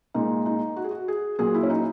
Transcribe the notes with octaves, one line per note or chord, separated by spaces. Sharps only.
A#2 G#3 D#4
D#4
F#4
G#4
F#4
G#4
A#2 F#3 G#4
E4
C#4
D#4